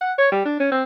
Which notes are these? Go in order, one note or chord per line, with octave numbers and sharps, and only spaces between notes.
F#5
C#5
G3
D4
C#4
C4